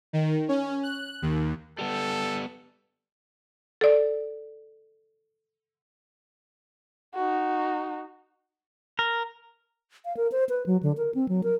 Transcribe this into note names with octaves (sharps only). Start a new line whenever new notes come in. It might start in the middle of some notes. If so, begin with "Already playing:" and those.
D#3
C#4
F#6
D#2
G3 B3 A4
A4 D5
D#4 F#4
A#4
F5
A#4
C5
B4
F#3
D3
A#4
C4
F#3
A#4